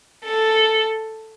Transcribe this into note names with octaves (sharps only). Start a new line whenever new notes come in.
A4